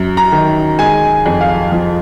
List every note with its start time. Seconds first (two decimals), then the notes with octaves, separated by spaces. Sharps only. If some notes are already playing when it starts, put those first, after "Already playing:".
Already playing: F#2
0.17 A#5
0.32 D#3
0.79 G#3 G#5
1.26 F2
1.41 F5
1.72 F3